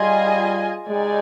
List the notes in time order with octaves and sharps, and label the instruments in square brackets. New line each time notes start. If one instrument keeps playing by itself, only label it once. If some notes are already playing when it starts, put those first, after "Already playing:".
Already playing: [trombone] G3 [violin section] F4 G#4 D#5 G#5
[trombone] G#3 [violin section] D#4 G4 D5 G#5